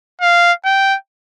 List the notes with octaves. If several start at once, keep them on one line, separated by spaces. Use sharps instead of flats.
F5
G5